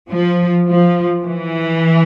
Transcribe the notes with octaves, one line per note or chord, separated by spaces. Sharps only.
F3
F3
E3